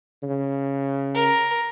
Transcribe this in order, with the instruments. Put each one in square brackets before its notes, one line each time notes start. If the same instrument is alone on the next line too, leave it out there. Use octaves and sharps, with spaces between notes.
[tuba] C#3
[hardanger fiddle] A#4